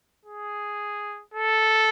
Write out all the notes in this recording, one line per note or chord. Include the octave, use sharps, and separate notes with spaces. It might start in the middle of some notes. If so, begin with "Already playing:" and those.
G#4
A4